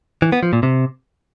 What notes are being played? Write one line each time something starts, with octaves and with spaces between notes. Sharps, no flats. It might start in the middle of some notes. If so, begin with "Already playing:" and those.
E3
B3
F3
A#2
C3